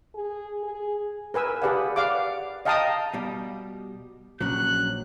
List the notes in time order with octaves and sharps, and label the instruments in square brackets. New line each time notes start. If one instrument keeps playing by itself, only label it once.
[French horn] G#4
G#4
[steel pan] A#4 B4 G#5 E6
G4 G#4 B4 D5 F5 F#5
D5 F5 F#5 D6
D#5 F5 G5 A5 A#5 D#6
[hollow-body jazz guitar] B2 G3
[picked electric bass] A#1 [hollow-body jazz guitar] F#3 C#4 [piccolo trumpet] F#6